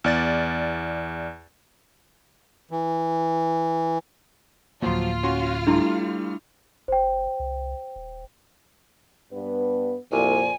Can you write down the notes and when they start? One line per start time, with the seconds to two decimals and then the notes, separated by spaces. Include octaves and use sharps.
0.04 E2 D5 A6
2.71 E3
4.82 D1 F3 F#3 A#3 F4 F6
5.23 C#4 F#4 C6
5.67 G3 A3 D4 E4
6.88 F#1 C5 G5
7.40 C2
7.96 D#1
9.32 G2 B3 B4
10.12 C2 F2 A#2 G#5